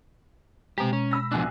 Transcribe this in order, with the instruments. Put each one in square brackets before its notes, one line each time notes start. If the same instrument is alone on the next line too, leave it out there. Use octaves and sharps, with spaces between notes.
[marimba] B2 G#3 [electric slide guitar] C4 G4 [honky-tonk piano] A#5
[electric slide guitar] C#4
[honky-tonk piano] B5 E6 A#6
[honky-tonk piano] C2 G#5 F#6 [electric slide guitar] F3 B3 D4